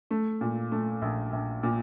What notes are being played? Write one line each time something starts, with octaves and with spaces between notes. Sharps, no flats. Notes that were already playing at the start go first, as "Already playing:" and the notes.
A3
A#2
A3
A#1
A#1
A#2